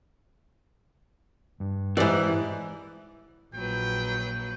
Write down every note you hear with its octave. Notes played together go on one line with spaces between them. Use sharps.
G2
F2 G#2 E3 E4 G4 D5
A#1 F#3 B4 G5